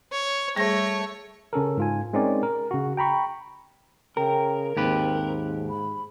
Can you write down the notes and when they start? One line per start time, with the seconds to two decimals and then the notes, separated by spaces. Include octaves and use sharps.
0.12 C#5
0.56 G3 A3 G#4 C#5 A#6
1.53 C#3 C#4 A4 A#4
1.77 G#2 F4 G#5
2.13 G#3 C4 C#4 D#4 A#4 D5
2.43 A#4
2.71 C#3 F#4
2.97 G5 A#5 B5 C#6
4.17 C#3 A#4 G5
4.77 D#2 G#2 C4 G4 B4
5.69 B5